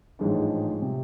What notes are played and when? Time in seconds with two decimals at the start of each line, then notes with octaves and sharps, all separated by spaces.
0.19 A1 G#2 F3 G#3 D4
0.82 C3